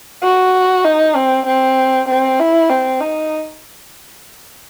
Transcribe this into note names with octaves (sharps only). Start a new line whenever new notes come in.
F#4
D#4
C4
C4
C4
E4
C4
D#4